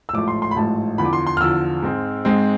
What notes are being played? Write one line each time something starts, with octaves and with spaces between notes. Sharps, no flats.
E6
A1 G#2 F3 A3 D6
C6
C6
B5
A1 G#2 F3 A3 A5
E2 D3 F3 B5
D6
C6
C6
F6
E2 D3 F3 E6
G#2 G#3 C4
G#2 G#3 C4